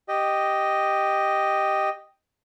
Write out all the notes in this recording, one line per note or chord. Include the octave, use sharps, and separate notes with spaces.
G4 D#5